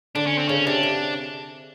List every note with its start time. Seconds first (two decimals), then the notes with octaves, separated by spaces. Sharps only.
0.15 D3 D4
0.27 C#4
0.38 C4
0.49 C#3 C#4
0.67 C3 D4
0.83 C3